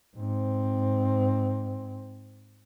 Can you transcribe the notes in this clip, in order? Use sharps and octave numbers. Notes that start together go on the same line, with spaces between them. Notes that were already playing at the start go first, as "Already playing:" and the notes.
G#2 C4